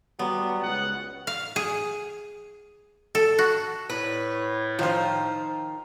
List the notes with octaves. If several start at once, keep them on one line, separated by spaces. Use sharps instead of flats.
F#3 G3 B3
C#2 F#5
F5
G#4
A4
F#4
A2 B4
D#3 F3 F4 C5